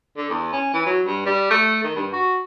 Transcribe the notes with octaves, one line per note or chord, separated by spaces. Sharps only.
D3
E2
C#4
E3
F#3
G2
G3
A3
D#3
G2
F#4